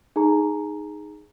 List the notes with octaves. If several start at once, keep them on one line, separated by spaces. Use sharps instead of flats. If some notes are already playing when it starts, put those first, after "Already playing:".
D#4 G#4 A#5